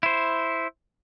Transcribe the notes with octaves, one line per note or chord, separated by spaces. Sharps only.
E4 C5